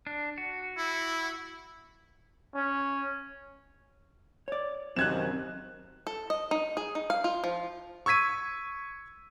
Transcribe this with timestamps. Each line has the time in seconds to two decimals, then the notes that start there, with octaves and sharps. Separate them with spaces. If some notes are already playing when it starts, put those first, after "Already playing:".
0.07 D4
0.38 F#4
0.78 E4
2.55 C#4
4.48 C#5 D5
4.96 F#2 C3 D#3 C4 F#6 G#6 E7
6.07 A4
6.30 D#5
6.51 D#4
6.77 G#4
6.95 D#4
7.10 F5
7.24 F4
7.44 F3
8.06 C#6 E6 G#6 B6 D#7